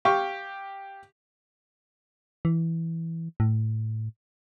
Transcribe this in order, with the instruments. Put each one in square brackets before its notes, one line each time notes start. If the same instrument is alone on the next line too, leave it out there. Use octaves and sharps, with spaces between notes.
[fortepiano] G4 F5 C#6
[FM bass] E3
A2